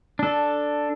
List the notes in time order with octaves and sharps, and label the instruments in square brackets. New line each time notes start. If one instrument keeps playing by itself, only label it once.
[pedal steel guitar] D4 A4